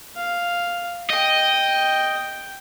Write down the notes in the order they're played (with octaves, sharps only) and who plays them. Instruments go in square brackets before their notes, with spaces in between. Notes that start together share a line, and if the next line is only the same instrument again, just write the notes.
[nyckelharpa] F5
[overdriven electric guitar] D#5 [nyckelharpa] G5